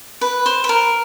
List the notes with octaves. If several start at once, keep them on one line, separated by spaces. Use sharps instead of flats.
B4
C5
B4
A#4